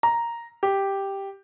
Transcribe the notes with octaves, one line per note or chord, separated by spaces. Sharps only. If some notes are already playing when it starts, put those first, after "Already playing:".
A#5
G4